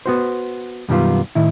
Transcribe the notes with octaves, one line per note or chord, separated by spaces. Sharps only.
B3 F#4 C5
F#2 B2 D#3 G3 B3 F4
A2 D#3 E4